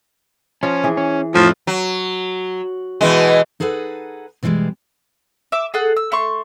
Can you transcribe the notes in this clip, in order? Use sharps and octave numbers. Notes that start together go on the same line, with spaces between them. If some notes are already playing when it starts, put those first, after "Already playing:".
F3 C#4 F4
E3 G#4
C#4
F2 A2 F3
F#3
B2 E3 G#3
D#4 G#4 A4 B4 F#5
B2 E3 F3 G3 G#3
E5 D6
G#4 A4 F#5
E6
A3 C6 C#6